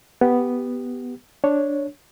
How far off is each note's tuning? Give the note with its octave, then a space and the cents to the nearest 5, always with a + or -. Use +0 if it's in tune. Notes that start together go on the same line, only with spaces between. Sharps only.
B3 +0 G4 +0
D4 -5 C#5 +0